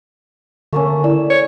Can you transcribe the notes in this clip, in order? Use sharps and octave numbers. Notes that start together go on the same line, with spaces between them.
D3 A3 A#3 C#4
E4 D5 E6
C#5